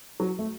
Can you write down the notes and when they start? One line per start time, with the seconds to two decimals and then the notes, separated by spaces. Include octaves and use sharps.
0.20 F#3
0.39 A3